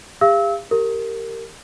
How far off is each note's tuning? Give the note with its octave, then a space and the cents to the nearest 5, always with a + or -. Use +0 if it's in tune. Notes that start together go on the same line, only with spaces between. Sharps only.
G4 +45 F5 -35 E6 -25
G4 +0 A#4 -20